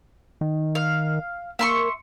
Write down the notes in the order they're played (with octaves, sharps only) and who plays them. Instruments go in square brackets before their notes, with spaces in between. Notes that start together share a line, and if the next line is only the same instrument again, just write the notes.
[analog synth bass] D#3
[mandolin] F5
[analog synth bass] A#3 [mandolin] E5 C6 C#6